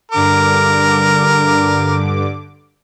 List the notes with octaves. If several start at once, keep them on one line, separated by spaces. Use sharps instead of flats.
G2 D3 A#4 D6